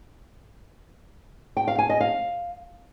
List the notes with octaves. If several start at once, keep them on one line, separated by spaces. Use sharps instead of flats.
G5
F5
G#5
D#5
F5